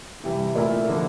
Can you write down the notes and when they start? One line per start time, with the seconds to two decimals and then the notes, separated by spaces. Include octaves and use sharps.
0.24 C3 E3 G3
0.55 A#2 A3 E4 A#4 D5
0.88 D3 F3 A#3 E4